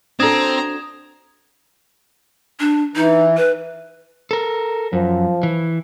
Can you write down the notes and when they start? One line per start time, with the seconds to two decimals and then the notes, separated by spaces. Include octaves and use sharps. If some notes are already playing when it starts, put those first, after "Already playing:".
0.20 C4 D4 F#4 A4 A#5 D#6 G#6 E7
2.60 D4
2.96 E3 D#4
3.37 B4
4.31 A4 A#4
4.93 F#2 F3
5.43 E3